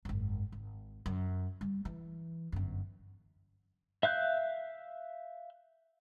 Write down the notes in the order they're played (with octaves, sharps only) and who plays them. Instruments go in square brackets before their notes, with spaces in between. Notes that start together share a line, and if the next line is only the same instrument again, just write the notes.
[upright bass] G#1 F#2
G#1
F#2
G3
E3
G1 F#2
[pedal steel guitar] E5 F5 F#6 G6